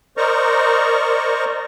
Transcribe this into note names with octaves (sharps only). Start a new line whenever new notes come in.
A#4 C5 D5 D#5 A#5 C#6